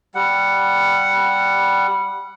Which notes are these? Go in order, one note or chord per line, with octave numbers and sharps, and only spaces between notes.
G3 F#5